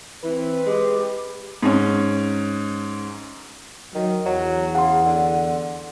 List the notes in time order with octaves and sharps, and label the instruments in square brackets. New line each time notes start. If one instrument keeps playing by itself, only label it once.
[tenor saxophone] E3 [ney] C4 [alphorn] B4
[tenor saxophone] G#3 [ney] G4
[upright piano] G#2 C#4
[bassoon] D#3 [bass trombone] F#3
[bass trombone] E2 [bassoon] F#3
[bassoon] C#3 [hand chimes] F#5 C6
[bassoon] D3